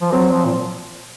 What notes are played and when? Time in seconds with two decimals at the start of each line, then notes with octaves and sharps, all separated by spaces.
0.01 F3
0.12 F#3 C4
0.31 F3
0.45 A#2